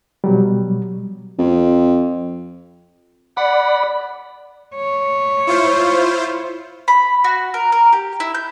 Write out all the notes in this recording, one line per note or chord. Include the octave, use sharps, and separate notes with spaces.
B2 F#3 G3
F2
D5 F#5 B5
C#5
E4 F4 C5
B5
F#4
A#4
A#4
G4
E4
G6